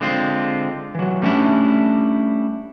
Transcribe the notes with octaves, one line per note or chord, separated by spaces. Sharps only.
D3 G#3 C4 F4
E3 F#3
G3 A3 C#4 D4 E4